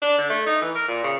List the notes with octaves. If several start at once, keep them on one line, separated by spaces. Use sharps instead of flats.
D4
D3
A3
D#4
E3
A#4
A#2
C#3